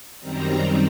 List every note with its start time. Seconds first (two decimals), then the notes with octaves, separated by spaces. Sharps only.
0.20 F#2 D#3 G3 C4 A#5